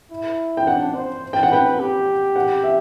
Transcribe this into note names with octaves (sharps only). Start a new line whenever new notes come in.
E4
G5
D4 F#5
C5
G5
F#5
B4 G5
G4
F#5
E5